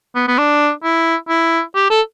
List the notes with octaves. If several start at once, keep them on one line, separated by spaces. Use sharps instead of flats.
B3
B3
D4
E4
E4
G4
A4